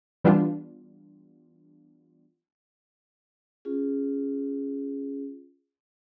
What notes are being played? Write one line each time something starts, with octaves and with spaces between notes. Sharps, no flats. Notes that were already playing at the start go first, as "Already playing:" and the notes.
E3 G3 B3 D4 F4
C#4 F4 G#4